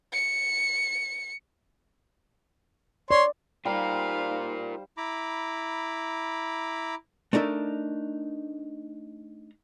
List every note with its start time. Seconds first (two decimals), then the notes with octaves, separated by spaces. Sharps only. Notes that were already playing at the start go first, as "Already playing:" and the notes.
0.13 C#7
3.11 C#5 D5 C6
3.65 G3 D#4 F4 A#4 C5 F5
4.97 E4 A#5 B5 D6
7.33 A3 D4 D#4 A#4 E5